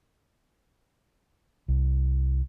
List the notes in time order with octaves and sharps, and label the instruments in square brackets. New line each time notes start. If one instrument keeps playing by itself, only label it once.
[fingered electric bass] C2